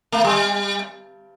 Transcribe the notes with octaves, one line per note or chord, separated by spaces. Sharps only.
A3
G3